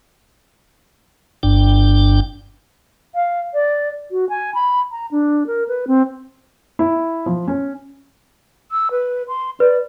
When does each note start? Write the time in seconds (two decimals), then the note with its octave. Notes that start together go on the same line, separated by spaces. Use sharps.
1.43 G1 G2 D4 G5
3.15 F5
3.54 D5
4.11 F#4
4.29 G#5
4.54 B5
4.91 A#5
5.11 D4
5.47 A#4
5.68 B4
5.87 C4
6.79 E4
7.26 F3
7.48 C#4
8.72 E6
8.91 B4
9.28 C6
9.60 B4 D5